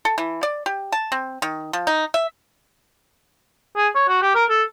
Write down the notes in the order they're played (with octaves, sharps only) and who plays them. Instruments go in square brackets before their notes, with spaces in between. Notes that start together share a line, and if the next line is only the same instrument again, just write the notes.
[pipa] A4
E3
D5
G4
A5
C4
D#3
F3
D#4
E5
[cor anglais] G#4
C#5
F#4
G4
A#4
A4